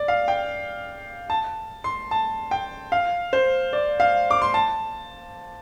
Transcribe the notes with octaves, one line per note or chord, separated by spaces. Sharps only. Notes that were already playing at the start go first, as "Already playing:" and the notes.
Already playing: D5
F5
G5
A5
C6
A5
G5
F5
C5
D5
F5
D6
C6
A5